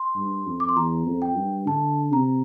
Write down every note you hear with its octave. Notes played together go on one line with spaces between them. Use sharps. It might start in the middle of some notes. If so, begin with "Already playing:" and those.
Already playing: C6
G2
F2
D6
C6
E2 A#5
F2
G5
G2
D3 A5
C3 A#5